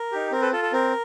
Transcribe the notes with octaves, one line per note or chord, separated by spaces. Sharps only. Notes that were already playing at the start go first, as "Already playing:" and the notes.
Already playing: A#4
D#4 G4
C4 A#4
A4 B4
F4 A4
A4
C4 A#4